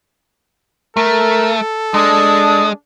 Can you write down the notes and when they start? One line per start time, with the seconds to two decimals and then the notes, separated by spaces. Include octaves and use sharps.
0.97 A3 A4 A#4
1.94 G#3 D4 D#6